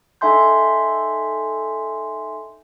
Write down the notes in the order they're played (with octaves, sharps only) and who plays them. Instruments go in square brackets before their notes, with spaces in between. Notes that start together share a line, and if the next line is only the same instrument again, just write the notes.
[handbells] D#4 A4 E5 G#5 C6 G6